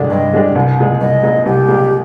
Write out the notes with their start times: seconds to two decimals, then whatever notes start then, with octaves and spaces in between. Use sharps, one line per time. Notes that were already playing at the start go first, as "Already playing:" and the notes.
Already playing: G2 D3 G#3 D4 G4
0.10 G2 D#5
0.33 D3 G#3 D4 G4
0.55 C2
0.78 A#2 G#3
1.01 C2 D#5
1.23 A#2 G#3
1.46 C2 G4
1.68 A#2 G#3